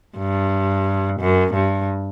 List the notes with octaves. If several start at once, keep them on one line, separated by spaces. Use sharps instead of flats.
G2
F#2
G2